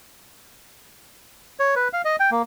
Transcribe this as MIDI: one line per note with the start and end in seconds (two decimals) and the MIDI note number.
1.59 1.75 73
1.76 1.88 71
1.93 2.02 77
2.05 2.16 75
2.20 2.30 79
2.31 2.42 58